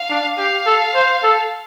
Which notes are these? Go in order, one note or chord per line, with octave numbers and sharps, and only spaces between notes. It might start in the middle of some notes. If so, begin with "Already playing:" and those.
Already playing: F5
D4
G4 F5
A4
C5
A4